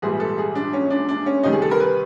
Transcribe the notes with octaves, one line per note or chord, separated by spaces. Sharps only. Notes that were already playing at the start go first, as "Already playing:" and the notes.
A#1 G#2 E3 G3 G#4
A4
G#4
D4
C#4
D4
D4
C#4
D2 C3 D#3 G3 D#4
G#4
A4
A#4
B4